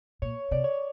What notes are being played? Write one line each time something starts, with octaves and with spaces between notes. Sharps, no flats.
A#2 C#5
C3 D5
C#5